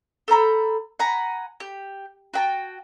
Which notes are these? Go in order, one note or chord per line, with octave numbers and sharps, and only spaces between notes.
A4 C5 A#5 B5
F#5 G#5 A#5 B5
G4
F#4 G5 A5